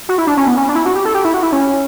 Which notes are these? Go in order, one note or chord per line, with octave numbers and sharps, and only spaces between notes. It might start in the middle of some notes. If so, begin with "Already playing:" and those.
F#4
E4
D4
C#4
B3
C#4
D4
E4
F#4
G4
A4
G4
E4
F#4
E4
C#4